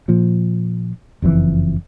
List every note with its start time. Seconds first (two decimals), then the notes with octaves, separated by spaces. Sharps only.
0.08 A#2 F3
1.22 F#1 F2 A2 E3